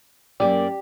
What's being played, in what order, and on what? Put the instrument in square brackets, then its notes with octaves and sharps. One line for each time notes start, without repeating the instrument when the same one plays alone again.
[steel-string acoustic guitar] F#2 A#3 [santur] G4 [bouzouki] D5